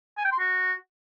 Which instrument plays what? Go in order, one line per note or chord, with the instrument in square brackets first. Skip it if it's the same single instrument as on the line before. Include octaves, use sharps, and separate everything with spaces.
[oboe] G#5
G5
C6
F#4